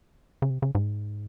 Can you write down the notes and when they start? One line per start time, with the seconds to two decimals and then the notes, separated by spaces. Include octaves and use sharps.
0.42 C#3
0.50 C3
0.62 C#3
0.75 G#2